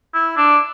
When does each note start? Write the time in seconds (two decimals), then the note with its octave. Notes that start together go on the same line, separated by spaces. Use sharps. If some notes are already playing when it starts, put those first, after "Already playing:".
0.14 E4
0.37 D4